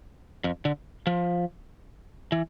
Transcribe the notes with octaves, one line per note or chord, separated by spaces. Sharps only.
F2
D3
F3
E3